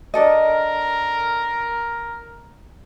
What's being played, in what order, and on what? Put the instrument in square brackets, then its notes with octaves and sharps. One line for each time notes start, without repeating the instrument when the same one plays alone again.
[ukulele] D4 A4 D#5 [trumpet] A#4